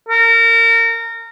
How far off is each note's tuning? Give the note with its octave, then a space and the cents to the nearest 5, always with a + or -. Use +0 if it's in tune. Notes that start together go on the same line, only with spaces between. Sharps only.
A#4 -25